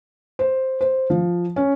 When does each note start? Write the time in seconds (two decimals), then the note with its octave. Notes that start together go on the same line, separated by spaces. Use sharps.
0.39 C5
0.81 C5
1.10 F3
1.56 C#4